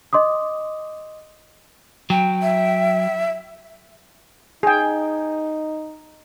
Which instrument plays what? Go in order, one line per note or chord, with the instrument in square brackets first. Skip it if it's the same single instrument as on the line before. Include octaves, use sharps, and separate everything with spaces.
[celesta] D#5 C6 D6 D#6
[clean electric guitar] F#3 [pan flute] G5
[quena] E5
[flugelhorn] D#4 [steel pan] G#4 G5